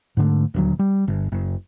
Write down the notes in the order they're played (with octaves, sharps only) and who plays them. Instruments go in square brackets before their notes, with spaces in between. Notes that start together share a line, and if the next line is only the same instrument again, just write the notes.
[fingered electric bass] G#2 D3 A3
D#1 D2 F#3
G3
G1
F#1